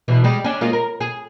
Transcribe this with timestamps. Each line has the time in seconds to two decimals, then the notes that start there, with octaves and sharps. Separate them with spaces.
0.08 E2 B2 E3
0.24 G3 G#3
0.44 C#4 D4
0.61 G#3 A#3 F4
0.73 A#4
1.01 G#4